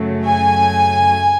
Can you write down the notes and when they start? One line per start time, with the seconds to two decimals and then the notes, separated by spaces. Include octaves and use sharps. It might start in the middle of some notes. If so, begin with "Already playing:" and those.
Already playing: F#2 C#3 F#3 A3
0.25 G#5